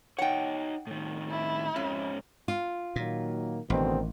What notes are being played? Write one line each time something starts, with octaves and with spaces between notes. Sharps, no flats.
D#4 C#5 F#5 G5
A2 D#3
E4
F2 G#2 C#4
F4
A#2 D#3 F#3 A#3
A1 B2 D3 D#3 C4